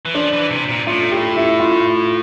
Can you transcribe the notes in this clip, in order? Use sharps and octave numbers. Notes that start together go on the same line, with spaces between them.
E3
F3 D4
E3
C3
A#2
A2 F4
G4
E4
F4